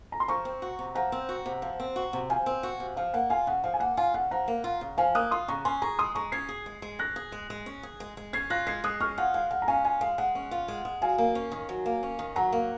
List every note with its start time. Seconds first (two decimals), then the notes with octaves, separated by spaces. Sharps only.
0.12 A#5
0.20 C6
0.28 F3 A#5 C#6
0.45 C4
0.62 F#4
0.79 C3
0.95 F3 F#5 A#5
1.12 C4
1.29 F#4
1.46 C3
1.62 F3
1.80 C4
1.96 F#4
2.13 C3
2.30 F3 F5 G#5
2.46 C4
2.63 F#4
2.80 C3
2.97 F3 F5
3.14 A#3 F#5
3.30 F4 F5 G#5
3.47 C#3 F#5
3.64 F3 F5
3.74 G#5
3.80 A#3 F#5
3.97 F4 F5 G#5
4.14 C#3 F#5
4.31 F3 F#5 A#5
4.48 A#3
4.64 F4
4.81 C#3
4.98 F3 F5 G#5
5.15 A#3 D#6 F#6
5.31 F4 C6 D#6
5.48 C#3 A#5 C#6
5.65 C#4 G#5 C6
5.82 G#4 A#5 C#6
5.99 G#3 C6 D#6
6.15 G#3 A#5 C#6
6.32 C#4 G#6 C7
6.49 G#4
6.66 G#3
6.82 G#3
6.99 C#4 F#6 A#6
7.16 G#4
7.32 G#3
7.50 G#3
7.66 C#4
7.83 G#4
8.00 G#3
8.17 G#3
8.33 C#4 G#6 C7
8.50 F4 F#6 A#6
8.67 G#3 G#6 C7
8.84 G#3 D#6 F#6
9.00 C#4 C#6 F6
9.18 F4 F#5
9.34 G#3 F5
9.51 G#3 F#5
9.62 A#5
9.68 C#4 F5 G#5
9.85 F4 F5 G#5
10.01 G#3 F5
10.18 G#3 F#5
10.35 C#4
10.51 F4
10.68 G#3
10.85 G#3
11.02 F#3 F5 G#5
11.18 A#3
11.35 C#4
11.52 D#3
11.69 F#3
11.86 A#3
12.03 C#4
12.19 D#3
12.36 F#3 F#5 A#5
12.53 A#3